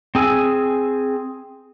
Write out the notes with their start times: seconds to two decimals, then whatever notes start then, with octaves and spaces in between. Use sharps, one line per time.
0.15 C4 G#4 G#5 E6